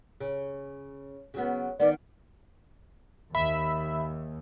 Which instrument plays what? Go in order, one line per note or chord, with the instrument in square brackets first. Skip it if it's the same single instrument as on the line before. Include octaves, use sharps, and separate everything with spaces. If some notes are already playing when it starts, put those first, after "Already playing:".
[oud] C#3
C#3 F#3 B3
[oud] D#3 B3 [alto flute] D5
[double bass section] D#2 [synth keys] E5 [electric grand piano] B5